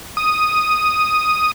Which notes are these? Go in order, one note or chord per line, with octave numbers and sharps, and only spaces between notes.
D#6